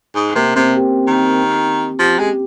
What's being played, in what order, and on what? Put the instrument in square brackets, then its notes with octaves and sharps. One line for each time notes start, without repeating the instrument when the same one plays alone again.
[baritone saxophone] G#2
[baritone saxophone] C3 [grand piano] A#3
[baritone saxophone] C3 [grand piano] C4
[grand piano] G4
[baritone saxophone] D#3
[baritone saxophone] F3 [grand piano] G4
[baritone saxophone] G#3 [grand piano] G4